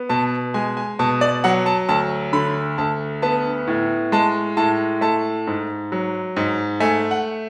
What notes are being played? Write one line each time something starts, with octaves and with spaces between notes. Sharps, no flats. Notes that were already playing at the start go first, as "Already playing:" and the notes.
Already playing: B3
B2 A5
G#3 G#5
G#5
B2 A5
D5
F#3 F#5
A5
D2 A5
D3 B5
D2 A5
B3 A5
A2
G#3 A5
A2 A5
A3 A5
G#2
F#3
G#2
A3 G#5
F#5